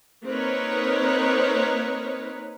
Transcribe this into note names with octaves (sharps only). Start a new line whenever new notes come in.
A#3 C4 D#4 A#4 B4 C#5